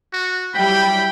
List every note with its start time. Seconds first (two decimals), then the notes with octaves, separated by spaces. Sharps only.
0.13 F#4
0.54 F#3 G3 E4 G5 B5